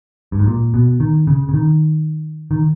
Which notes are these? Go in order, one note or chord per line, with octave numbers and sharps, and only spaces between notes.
G2
G#2
A#2
B2
D#3
C#3
C#3
D#3
D#3